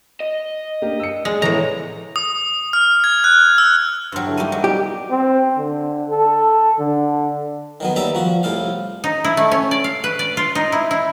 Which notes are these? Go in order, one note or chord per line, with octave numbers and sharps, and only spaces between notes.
D#5
A#3 D4 G4
E6 C#7
G#3 G#4 D5 G#5
E2 A2 E3 C#5 A#5
D#6
F6
G#6
F#6
E6
G2 F#3 G5 C6 F6
D3 E4 A4
G3 A3 A#3 D#4 E5 D#7
F#3
D#4 G4 D5
C4
D3
A4
D3
D#3 F#3 B3
D#2 G3 A4 E5 A#5
F3 F#4
C2 A2 A4 F5
D#4
E4
A3
C#4
D5
F5
B4
D5
F4
D#4
E4
E4